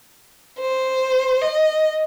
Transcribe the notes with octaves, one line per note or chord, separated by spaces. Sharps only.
C5
D#5